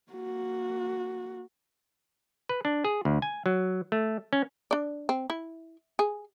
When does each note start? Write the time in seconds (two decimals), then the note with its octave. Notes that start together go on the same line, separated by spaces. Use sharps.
0.12 A#3 F#4
2.49 B4
2.65 D4
2.84 G#4
3.05 D2
3.22 G#5
3.46 F#3
3.92 A3
4.33 C#4
4.71 D4 D5
5.09 C4
5.30 E4
5.99 G#4